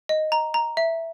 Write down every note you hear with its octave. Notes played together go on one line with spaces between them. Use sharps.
D#5
A#5
A#5
E5